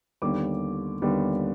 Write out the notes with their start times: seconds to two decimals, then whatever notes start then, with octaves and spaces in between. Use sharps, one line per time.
0.22 D#2 D3 G3 B3 D6
1.02 D#2 D3 G3 B3